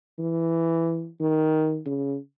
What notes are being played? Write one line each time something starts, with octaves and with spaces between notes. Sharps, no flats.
E3
D#3
C#3